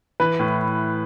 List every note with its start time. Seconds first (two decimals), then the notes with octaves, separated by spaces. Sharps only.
0.20 E3 B4
0.39 A2